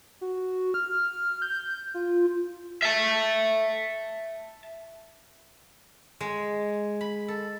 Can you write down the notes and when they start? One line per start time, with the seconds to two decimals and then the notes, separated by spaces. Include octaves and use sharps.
0.21 F#4
0.74 F6
1.42 G6
1.94 F4
2.82 E5 A5
6.21 G#3
7.01 B5
7.28 A4